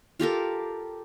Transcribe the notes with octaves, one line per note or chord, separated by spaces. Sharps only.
F4 G4 A4 A#4